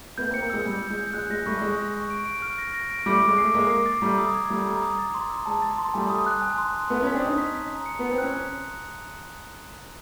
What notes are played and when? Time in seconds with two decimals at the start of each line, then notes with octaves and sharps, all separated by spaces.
0.18 A3 B3 G6
0.30 A#3 C4
0.34 C#7
0.42 A#3 C4
0.50 G#3 E6
0.66 G3 G6
0.82 G6
0.90 G#3
0.98 G6
1.13 G#3 F#6
1.30 G#3 A#6
1.46 G3 A3 C#6
1.62 G#3 F#6
1.78 F#6
1.94 C#6
2.10 D7
2.26 D7
2.42 F6
2.58 A#6
2.74 A#6
2.91 D7
3.06 G3 A3 D6
3.22 D6
3.28 G#3
3.38 A3 C7
3.54 G#3 A#3 D6
3.70 C7
3.86 A6
4.02 G3 A3 A#5
4.18 D#6
4.35 G#6
4.50 G3 A3 D#6
4.66 A#5
4.82 D#6
4.99 A6
5.14 C6
5.30 E6
5.46 G#3 A5
5.62 A6
5.78 C6
5.94 G3 A3 G#5
6.10 D#6
6.26 F#6
6.42 G#5
6.58 C6
6.74 C6
6.90 A3 B3 F#6
7.02 B3 C#4
7.07 B6
7.14 C4 D4
7.22 C#4 D#4 D#6
7.38 B6
7.55 B6
7.71 A#5
7.86 C#7
7.99 B3 C#7
8.11 C4
8.18 C#4 F#6